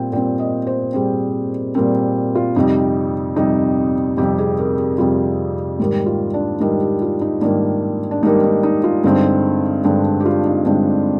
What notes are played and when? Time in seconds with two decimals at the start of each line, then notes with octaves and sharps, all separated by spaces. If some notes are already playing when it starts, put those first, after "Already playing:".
Already playing: A#2 G3 C4 G5
0.12 A#2 G3 C4 G5
0.39 D#5
0.67 C5
0.93 A#2 G3 C4 G#4
1.74 A#2 G3 C4 A#4
2.35 F4
2.56 F2 C3 G3 D#4
3.36 F2 C3 G3 D#4
4.17 F2 C3 G3 G4
4.38 G#4
4.58 A#4
4.78 G4
4.98 F2 C3 G3 F4
5.79 G#2 D#3 G3 A#3 G4
6.06 F4
6.34 D4
6.60 G#2 D#3 G3 A#3 D#4
6.81 G4
7.02 F4
7.21 D#4
7.41 G#2 D#3 G3 A#3 D4
8.11 D4
8.23 G#2 D#3 G3 A#3 D#4
8.43 D#4
8.63 D#4
8.84 F4
9.03 G2 D3 G#3 C4 D#4
9.84 G2 D3 G#3 C4 D4
10.20 G4
10.25 F4
10.45 D#4
10.66 G2 D3 G#3 C4 D4